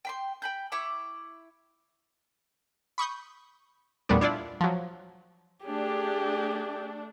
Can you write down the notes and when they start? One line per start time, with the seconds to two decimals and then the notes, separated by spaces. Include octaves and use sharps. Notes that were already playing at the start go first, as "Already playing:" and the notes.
0.05 G5 B5 C6
0.42 G5 B5 G6
0.72 E4 B5 C#6 D6
2.98 B5 C#6 D#6 G6
4.09 E2 A#2 G3 A3 B3 D4
4.21 D4 E4 F4 D5
4.61 F3 F#3
5.66 A3 D4 G4 G#4